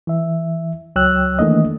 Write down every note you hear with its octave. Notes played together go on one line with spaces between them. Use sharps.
E3 E5
C#2 F#3 C#5 G5 E6 F#6
D#3 E3 A3 A#3 D4 D#5